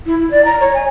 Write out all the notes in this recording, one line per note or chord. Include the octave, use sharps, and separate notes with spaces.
E4
E4
D5
A#5
C#5
G#5